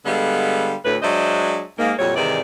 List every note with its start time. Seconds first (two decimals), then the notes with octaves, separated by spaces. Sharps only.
0.06 D3 G3 G#3 B3 A4 F5
0.85 D2 A2 B4
1.02 F#3 G#3 D4 C5 D#5 E5
1.79 G#2 A#3
1.99 F2 A#2 F#3 G3 C#5
2.16 G#2 C3 D#3 E3 D5